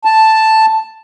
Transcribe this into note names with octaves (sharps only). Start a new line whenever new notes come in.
A5